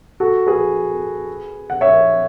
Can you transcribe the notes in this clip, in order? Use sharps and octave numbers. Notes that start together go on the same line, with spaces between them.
F#4 A4
G#4 B4
F#5
C#5 E5